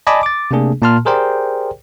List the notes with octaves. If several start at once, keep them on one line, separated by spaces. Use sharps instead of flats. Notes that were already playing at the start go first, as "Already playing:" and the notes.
D5 D#5 G#5 A5 B5 D6
D6 A6
C3 A3 A#3 D4 G#4
A#2 A#3 A5 C6 F6
G4 G#4 A#4 C5 D5 G5